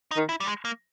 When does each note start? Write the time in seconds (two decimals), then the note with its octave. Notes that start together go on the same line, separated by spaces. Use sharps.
0.11 D#4
0.17 D#3
0.29 E4
0.40 G3
0.47 G#3
0.65 A#3